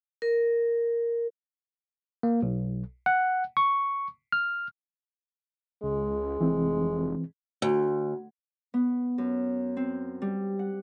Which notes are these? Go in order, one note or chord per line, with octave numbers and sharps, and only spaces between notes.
A#4
A#3
B1
F#5
C#6
F6
C#2 G#3
F1 E3 C4
D2
B3
F#2
C4
G3
F#5